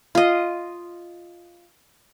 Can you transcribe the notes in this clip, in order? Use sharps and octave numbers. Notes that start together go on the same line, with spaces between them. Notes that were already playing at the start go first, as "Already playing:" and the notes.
F4 D#5